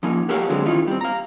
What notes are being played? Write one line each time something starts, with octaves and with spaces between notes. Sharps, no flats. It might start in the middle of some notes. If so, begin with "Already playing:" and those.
F3 A#3 C#4 D#4
F#4 G4 A4 A#4 C#5 F5
D3 F#3 G#3 C4
D#3 E3 C#4 D#4 F4
G3 C4
F5 A#5